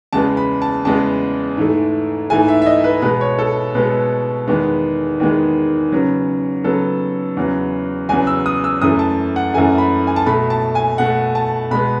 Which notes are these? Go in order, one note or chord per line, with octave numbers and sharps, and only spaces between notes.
E2 C#3 G#3 B3 A5
B5
A5
E2 C#3 G#3 B3 A5
G#2 E3 A3
G#2 E3 A3 G#5
E5
E5
D#5
B4
B2 G#3 B3 B4
C#5
A4
B2 G#3 B3 B4
E2 D#3 G#3 B3
E2 D#3 G#3 B3
C#3 F#3 B3
C#3 F#3 B3 A4
E2 C#3 F#3 B3
E2 C#3 F#3 B3 G#5
E6
D#6
E6
F#2 E3 A3 D#6
A5
F#5
F#2 E3 A3 G#5
B5
G#5
A5
B2 A3 B5
A5
G#5
B2 A3 F#5
A5
B2 G#3 B3 B5